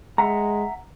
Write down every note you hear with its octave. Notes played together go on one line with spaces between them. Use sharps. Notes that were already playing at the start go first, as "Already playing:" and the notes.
G#3 E5 F#5 A#5